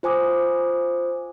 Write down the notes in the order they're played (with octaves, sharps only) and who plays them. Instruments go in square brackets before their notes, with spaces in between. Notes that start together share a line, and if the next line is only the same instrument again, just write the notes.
[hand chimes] F4 C5 G#5 D6 D#6